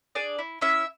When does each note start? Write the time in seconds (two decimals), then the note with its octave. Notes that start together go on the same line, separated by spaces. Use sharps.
0.15 D4 G#4 D5
0.39 E4
0.61 C#4 E4 E5